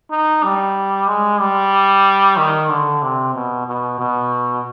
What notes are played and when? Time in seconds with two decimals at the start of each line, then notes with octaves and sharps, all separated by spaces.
0.11 D#4
0.43 G3
1.08 G#3
1.39 G3
2.37 D#3
2.70 D3
3.02 C3
3.34 B2
3.67 B2
3.98 B2